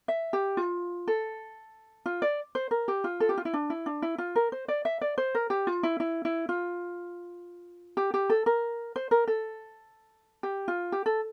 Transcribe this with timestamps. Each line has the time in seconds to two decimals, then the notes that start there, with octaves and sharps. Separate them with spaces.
0.08 E5
0.33 G4
0.57 F4
1.08 A4
2.06 F4
2.22 D5
2.55 C5
2.71 A#4
2.88 G4
3.04 F4
3.20 A4
3.29 G4
3.38 F4
3.45 E4
3.54 D4
3.70 E4
3.86 D4
4.02 E4
4.18 F4
4.36 A#4
4.52 C5
4.68 D5
4.85 E5
5.01 D5
5.18 C5
5.35 A#4
5.50 G4
5.67 F4
5.83 E4
6.00 E4
6.25 E4
6.49 F4
7.97 G4
8.14 G4
8.30 A4
8.46 A#4
8.96 C5
9.11 A#4
9.28 A4
10.43 G4
10.68 F4
10.92 G4
11.06 A4